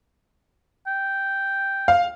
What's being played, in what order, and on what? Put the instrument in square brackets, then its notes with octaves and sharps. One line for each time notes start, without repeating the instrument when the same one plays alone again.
[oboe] G5
[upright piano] F5